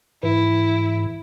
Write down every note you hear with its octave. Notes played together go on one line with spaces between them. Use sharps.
G#2 E3 E4